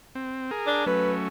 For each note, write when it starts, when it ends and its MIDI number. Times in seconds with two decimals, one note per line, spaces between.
0.15 0.51 60
0.51 0.84 68
0.51 0.84 70
0.67 0.83 62
0.86 1.28 54
0.86 1.28 57
0.86 1.28 61
0.86 1.13 71